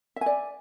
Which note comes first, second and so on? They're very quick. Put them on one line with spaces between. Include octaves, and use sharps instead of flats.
E5 G#5 D5